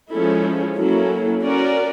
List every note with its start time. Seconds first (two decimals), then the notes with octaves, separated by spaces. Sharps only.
0.11 F3 G#3 C#4 E4 A4
0.77 F#3 A#3 C#4 E4 A4
1.43 C#4 F#4 A#4 D5